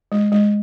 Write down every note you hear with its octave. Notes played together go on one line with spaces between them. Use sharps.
G#3
G#3